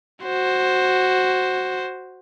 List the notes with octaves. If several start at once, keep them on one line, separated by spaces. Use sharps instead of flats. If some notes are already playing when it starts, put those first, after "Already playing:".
F#4 C5